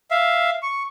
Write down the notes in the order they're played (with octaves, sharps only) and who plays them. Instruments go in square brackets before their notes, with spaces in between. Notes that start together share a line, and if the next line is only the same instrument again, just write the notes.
[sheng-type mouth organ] E5 F5
C#6